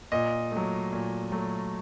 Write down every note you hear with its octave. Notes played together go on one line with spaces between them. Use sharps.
A#2 D#5
F#3 A3
A#2
F#3 A3